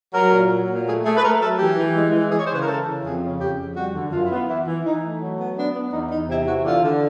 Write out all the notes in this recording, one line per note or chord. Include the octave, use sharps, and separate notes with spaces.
F#3 A#4
A#2
F#3
A#2
A3 G#4
A3 G#4
B4
A3 A#4
F#3 A4
E3 G4
E3
G#3
E3
E3 G#4
C#5
C5
C#3 B4
A#4
E3 A4
C#3
F2 G#4
C#3
F2 G4
F2
G3 F#4
D3
F#2 F4
E4
B3
F4
E3 E4
E3
E3 D#4
A3
F#3
B3
B3 D4
B3
E2 D#4
E2 D#4
C3 E4
E3 F#4
D3 F4
D3